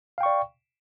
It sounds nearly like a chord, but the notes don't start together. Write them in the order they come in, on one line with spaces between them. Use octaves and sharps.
F5 G5 C#6 D5